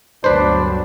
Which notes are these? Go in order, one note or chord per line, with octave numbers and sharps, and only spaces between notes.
G1 D2 F#3 D4 B4 C5